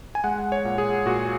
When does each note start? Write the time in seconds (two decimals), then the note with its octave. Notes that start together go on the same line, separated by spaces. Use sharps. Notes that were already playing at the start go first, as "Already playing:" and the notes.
0.15 G#5
0.24 G#3 F#5
0.52 C#5
0.65 A#2
0.78 G#4
1.06 A#2 F#4